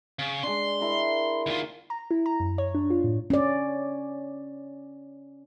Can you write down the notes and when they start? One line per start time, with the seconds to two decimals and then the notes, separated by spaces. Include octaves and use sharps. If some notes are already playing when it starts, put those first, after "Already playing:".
0.19 C#3
0.43 G#3 D4 C6
0.80 E4 A#4 B5
1.46 D2 D#4 F4
1.90 A#5
2.11 E4
2.26 A#5
2.40 F#2
2.58 C#5
2.75 D4
2.90 F4
3.04 A2
3.30 C#4 D5